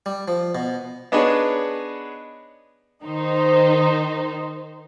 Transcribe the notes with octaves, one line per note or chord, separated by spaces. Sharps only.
G3
F3
B2
B3 D4 D#4 G#4 B4 C#5
D#3 D#4 C5